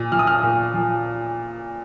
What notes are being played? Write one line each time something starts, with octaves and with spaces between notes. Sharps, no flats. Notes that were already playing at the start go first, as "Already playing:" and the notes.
Already playing: A#2
F3 F6
D#6
F6
A#2
F3